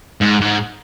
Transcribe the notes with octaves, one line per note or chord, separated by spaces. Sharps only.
G#2
G#2